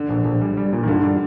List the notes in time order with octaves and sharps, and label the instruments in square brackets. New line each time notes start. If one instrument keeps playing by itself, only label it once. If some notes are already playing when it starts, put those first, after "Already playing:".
Already playing: [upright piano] D3
[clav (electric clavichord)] A#1
A#1
G3
G3
A#2
[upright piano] D#3
[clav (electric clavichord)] G2 [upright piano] D3
[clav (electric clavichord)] G3